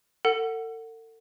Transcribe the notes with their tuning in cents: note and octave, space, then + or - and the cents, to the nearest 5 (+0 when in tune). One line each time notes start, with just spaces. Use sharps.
A4 +40 F#5 +0